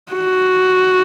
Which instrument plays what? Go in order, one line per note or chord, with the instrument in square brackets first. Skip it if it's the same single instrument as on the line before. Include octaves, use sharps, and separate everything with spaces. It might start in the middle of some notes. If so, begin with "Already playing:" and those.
[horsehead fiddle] F#4